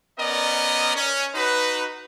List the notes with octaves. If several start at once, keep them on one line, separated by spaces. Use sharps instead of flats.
B3 C#4 A#4 D5 D#5
C#4
D#4 F#4 B4